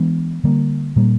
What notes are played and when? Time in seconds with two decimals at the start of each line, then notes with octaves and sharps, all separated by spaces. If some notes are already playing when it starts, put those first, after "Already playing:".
Already playing: E3 G#3 B3 D4
0.44 D3 G3 A#3
0.96 A#2 G3 A#3